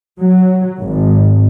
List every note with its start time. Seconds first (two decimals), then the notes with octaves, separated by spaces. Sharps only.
0.19 F#3
0.82 G#1